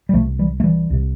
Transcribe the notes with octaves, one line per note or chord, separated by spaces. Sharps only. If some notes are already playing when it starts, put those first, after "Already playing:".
G3
C2 C3 F3 A3
E3 G3
A3
E3 G3
C2 C3